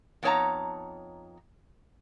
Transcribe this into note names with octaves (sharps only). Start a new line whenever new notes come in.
F2 B3 D#4 C#5 A5 A#5